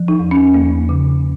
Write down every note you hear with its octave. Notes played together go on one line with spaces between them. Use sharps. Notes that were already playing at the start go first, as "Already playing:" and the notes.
Already playing: F3
D#4
E2
C#4
E2 A#3
C#3